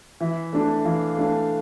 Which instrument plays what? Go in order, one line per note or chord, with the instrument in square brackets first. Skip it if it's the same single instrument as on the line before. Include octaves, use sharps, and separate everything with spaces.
[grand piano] E3 [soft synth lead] E5
[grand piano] A3 D4
[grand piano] E3 [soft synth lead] F5
[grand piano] A3 D4